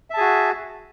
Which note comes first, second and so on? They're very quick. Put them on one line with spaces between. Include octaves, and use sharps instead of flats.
E5 A5 G#4 F#4